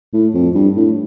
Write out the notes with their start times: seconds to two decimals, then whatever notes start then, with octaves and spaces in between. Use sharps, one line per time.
0.13 A2
0.34 F2
0.55 G2
0.76 A2